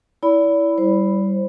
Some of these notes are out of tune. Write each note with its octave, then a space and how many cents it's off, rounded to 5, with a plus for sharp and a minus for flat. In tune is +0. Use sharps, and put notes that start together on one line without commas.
E4 +0 D5 -40 B5 +5
G3 -10 C5 +10